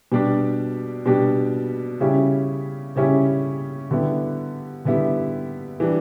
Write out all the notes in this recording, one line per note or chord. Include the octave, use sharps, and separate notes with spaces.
B2 G3 D4 G4
B2 G3 D4 G4
C#3 G3 C#4 E4 G4
C#3 G3 C#4 E4 G4
D3 G3 B3 E4 G4
D3 G3 B3 E4 G4
E3 G3 D4